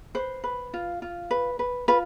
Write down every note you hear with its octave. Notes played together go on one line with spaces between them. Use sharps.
B4 C5
B4
F4
F4
B4
B4
F4 B4